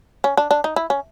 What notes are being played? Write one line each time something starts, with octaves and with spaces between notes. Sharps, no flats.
C#4
D4
D4
D#4
E4
C#4